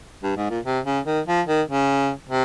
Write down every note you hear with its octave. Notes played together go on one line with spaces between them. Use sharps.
G2
G#2
A#2
C3
C#3
D#3
F3
D#3
C#3
C3